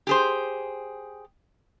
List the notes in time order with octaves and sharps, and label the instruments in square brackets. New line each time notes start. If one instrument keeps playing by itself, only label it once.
[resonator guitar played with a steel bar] G4 G#4 C5